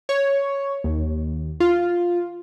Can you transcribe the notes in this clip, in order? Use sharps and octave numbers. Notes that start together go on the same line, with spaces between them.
C#5
D#2
F4